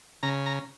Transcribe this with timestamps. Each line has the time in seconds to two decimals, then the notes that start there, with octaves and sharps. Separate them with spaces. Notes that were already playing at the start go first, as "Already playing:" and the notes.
0.23 C#3 A#5
0.46 A#5